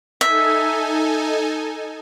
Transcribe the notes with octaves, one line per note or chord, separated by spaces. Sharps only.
D#4 A4 E5 G#5